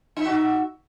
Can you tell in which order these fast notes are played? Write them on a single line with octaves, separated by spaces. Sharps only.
D#4 E5 F#4